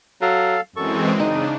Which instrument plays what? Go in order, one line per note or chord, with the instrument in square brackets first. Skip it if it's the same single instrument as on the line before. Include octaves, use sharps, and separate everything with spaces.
[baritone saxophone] F#3 [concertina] A4 F5
[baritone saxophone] F#2 [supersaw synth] E3 G#3 C4 [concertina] A4 C#6
[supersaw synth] C#3 D4 [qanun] D#4 [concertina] D#6